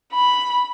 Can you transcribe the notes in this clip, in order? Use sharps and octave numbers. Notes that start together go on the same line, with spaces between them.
B5